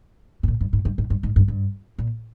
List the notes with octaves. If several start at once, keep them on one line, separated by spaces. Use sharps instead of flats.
G#2
A#2
G2
G#2
G2
G#2
G2
G#2
G2
G2
A#2